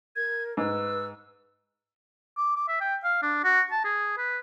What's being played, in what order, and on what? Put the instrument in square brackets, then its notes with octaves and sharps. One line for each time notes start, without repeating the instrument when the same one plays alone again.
[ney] A#4 [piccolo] G#6
[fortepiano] G#2 [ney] B4 [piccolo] E6
[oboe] D6
D6
E5
G5
F5
D4
F#4
A5
G#4
B4